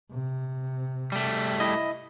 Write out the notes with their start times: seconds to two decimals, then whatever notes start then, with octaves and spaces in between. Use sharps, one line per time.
0.12 C3
1.12 G3 A3
1.60 E4 D#5